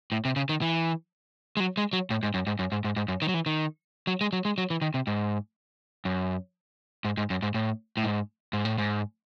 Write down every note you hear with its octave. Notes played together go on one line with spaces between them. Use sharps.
A2
C3
C#3
D#3
E3
G#3
F#3
G#3
F#3
A2
G#2
F#2
G#2
F#2
G#2
G#2
G#2
F#2
D#3
F#3
E3
D#3
F#3
G#3
F#3
G#3
F#3
E3
D#3
C3
G#2
F#2
G#2
G#2
F#2
G#2
A2
A2
G#2
G#2
A2
G#2